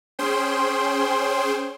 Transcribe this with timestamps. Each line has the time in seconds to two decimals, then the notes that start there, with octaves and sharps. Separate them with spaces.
0.19 C#4 G#4 C5 G5 C6